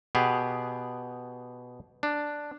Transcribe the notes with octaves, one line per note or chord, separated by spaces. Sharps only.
B2 B3 G4 G#4
D4